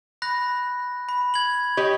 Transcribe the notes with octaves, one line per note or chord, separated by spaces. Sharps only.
B5 F#6 A#6
B5
G#6 F#7
G4 C#5 D#5